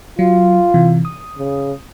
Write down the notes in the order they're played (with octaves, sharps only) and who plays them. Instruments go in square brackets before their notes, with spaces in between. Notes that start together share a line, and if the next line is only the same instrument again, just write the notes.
[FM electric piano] F#3 [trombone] F4
[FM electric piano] C3 E3
D#6
[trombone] C#3